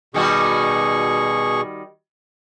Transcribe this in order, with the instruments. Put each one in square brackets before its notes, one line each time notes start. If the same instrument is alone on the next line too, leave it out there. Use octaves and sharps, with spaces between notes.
[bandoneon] B2 G#4 C#6 [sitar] D#3 G3 F#4